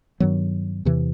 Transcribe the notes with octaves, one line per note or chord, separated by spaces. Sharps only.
G2 D#3 F#3 B3
E2 C3 E3